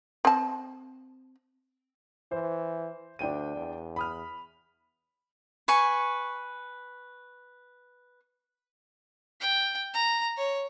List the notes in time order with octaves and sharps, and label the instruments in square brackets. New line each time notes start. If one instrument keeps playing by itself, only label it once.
[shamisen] C4 A5
[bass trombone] E3 [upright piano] C5
[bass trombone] D2 [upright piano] D4 G5 D#7
[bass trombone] E2
[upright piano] B5 D#6 F6
[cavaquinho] B4 G#5 C#6
[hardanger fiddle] G5
A#5
C#5